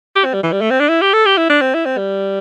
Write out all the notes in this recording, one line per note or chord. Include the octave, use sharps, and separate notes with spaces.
G4
C4
G3
E3
G3
A3
C4
D4
E4
G4
A4
G4
E4
D4
C4
E4
C4
G3